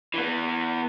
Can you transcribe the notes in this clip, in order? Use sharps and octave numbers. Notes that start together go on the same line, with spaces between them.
E3 B3